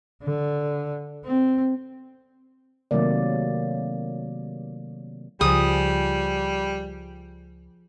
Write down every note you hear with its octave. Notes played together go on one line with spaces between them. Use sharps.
D3
C4
C3 D#3 F#3 A3 A#3 D5
C#2 F3 G3 G#4 D#6